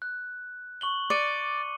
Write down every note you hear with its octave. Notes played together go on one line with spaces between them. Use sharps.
F#6
C#6 F#7 G7
D5 D6 C#7 D#7